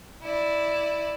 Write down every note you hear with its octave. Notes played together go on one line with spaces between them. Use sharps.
E4 D5